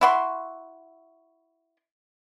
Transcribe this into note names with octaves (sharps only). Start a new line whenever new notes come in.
E4 F#4 C6